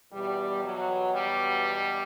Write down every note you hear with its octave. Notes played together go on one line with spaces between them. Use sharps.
E2 B2 G3
F#3
G3